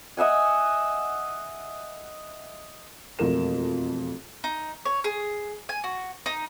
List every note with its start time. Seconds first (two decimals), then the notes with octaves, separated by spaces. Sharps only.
0.17 D#5 E5 F#5 G#5
3.19 E1 F2 A3 A#4 E7
4.44 D#4
4.85 C#5
5.04 G#4
5.69 G#5
5.84 F#4
6.26 D#4